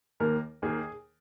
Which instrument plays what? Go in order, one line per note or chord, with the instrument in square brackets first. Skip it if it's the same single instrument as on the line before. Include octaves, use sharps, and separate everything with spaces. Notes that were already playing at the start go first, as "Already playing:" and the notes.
[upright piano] D#2 D#3 A#3 A#4
D#2 D#3 A#3 G#4